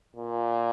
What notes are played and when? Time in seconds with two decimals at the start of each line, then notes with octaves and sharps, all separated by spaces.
0.16 A#2